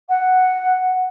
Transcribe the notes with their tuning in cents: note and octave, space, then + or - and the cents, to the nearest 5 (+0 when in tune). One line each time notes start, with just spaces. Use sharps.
F#5 +0